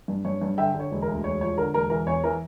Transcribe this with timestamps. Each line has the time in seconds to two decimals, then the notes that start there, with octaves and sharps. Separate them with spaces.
0.08 G2
0.25 G2 C#5
0.41 G2
0.58 D3 E5 G5
0.74 D3
0.80 C#5
0.91 E1
1.02 A#4
1.08 D2
1.24 E1 C#5
1.41 F3 C#5
1.58 D3 A#4
1.74 E1 A#4
1.90 E3 A#4
2.06 E2 C#5
2.24 E3 A#4